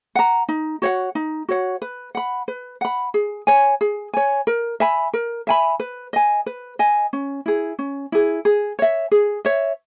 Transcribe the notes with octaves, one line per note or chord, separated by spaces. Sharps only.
F#5 A#5
D#4
F#4 C#5 F#5
D#4
F#4 C#5 F#5
B4
F#5 B5
B4
F#5 B5
G#4
C#5 G#5
G#4
C#5 G#5
A#4
E5 G#5 B5
A#4
E5 G#5 B5
B4
D#5 G#5
B4
D#5 G#5
C#4
E4 G#4
C#4
E4 G#4
G#4
C#5 E5
G#4
C#5 E5